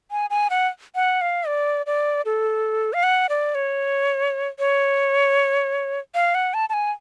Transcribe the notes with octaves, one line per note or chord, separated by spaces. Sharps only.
G#5
G#5
F#5
F#5
F5
D5
D5
A4
F5
F#5
D5
C#5
C#5
F5
F#5
A5
A5
G#5